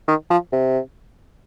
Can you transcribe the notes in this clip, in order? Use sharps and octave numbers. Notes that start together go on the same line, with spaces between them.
D#3
F3
C3